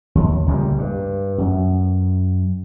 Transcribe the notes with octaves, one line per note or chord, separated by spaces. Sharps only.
D#2
C#2 A#2 F#3 G3
G2
F#2